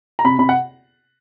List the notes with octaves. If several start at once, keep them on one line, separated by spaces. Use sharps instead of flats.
A#5
C3 B5
C3 B5
F#5